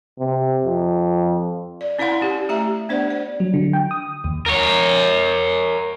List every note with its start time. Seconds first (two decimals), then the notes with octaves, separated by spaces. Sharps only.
0.19 C3
0.65 F2
1.81 D5
1.99 C#4 E4 D5 F5 F#5 C6
2.22 C#4 G4
2.49 A3 G4 E5 A#5
2.89 B3 D4 C5 D5 F#5
3.10 D5
3.40 F#3
3.54 D3
3.73 G5
3.91 D#6
4.24 D#2
4.46 A#4 C#5